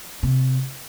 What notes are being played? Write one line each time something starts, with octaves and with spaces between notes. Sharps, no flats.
C3